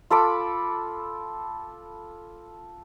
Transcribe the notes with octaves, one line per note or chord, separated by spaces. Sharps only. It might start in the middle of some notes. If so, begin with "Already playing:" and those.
F4 A4 B5 D6